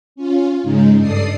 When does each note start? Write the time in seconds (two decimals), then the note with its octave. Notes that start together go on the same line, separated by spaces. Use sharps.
0.16 C#4 F4
0.63 G#2 C#3 G#3 D#4
0.99 G2 A4 D5 D#6 C7